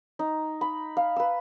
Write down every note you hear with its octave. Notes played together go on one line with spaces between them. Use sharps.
D#4
B5
F5
B4 E6